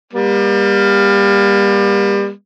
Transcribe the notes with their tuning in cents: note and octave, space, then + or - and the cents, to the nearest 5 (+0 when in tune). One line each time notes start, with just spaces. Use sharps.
G3 +30 A#3 +40